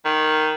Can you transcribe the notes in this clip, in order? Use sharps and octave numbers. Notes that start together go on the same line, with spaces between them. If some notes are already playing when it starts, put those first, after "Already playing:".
D#3